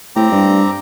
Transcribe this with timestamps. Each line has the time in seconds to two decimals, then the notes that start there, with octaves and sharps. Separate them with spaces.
0.16 A2 C4 G4 A#5
0.32 G2